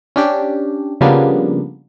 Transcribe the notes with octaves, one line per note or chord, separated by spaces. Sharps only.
C#4 D4 G4
C#3 F3 G3 A#3 B3 D4